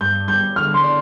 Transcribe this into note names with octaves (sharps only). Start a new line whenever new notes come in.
G2 G6
G3 G6
D3 F6
C6
D5